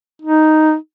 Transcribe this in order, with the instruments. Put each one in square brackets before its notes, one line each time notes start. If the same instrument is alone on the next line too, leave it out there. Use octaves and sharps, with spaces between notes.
[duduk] D#4